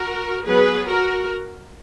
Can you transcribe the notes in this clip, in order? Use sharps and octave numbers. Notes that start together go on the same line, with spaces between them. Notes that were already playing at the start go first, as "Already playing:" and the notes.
Already playing: F#4 A#4
F#3 B3 G#4 B4
F#4 A#4